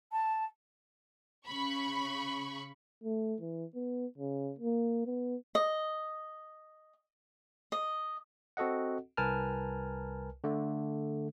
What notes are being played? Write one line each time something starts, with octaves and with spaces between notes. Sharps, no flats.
A5
C#3 B5 C#6
A3
E3
B3
C#3
A#3
B3
D#5
D#5
C4 F#4 A4 D#5 F#5
C2 A#4 B4 G#5 A5 F6
D3 A3